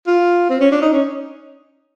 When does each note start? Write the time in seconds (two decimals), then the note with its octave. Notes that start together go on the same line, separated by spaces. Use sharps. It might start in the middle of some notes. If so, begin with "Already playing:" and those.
0.07 F4
0.49 C4
0.60 C#4
0.72 D4
0.82 D#4
0.93 C#4